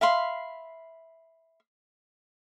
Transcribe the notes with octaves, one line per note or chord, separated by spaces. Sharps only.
E5 F5 B5 C6